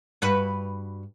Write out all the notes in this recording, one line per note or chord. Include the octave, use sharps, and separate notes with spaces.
G2 F#4 B4